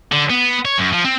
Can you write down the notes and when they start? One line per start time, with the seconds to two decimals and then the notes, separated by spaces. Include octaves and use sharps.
0.12 D3
0.30 B3
0.65 C#5
0.78 F#2
0.93 F3
1.05 C4